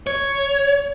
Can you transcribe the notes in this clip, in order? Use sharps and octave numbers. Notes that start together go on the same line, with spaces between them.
C#5